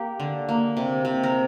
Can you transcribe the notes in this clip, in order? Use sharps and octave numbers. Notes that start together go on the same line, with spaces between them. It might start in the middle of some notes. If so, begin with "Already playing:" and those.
Already playing: A#3 G4
D3
A#3
C3
C3
A#4